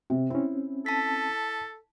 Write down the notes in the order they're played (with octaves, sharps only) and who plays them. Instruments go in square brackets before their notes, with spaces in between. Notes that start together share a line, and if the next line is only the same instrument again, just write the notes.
[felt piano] C3
[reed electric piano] C4 C#4 [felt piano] E4
[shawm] A4 [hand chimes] A5 B6